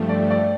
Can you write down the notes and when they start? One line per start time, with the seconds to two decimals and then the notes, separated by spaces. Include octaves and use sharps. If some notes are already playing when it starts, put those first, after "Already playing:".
Already playing: G2 F3 A3 G4 A4
0.09 D5
0.31 D5